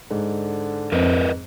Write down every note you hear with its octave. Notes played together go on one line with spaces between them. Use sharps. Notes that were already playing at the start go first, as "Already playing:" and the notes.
G#2 D3
F2 C4 A#4 B4 D#5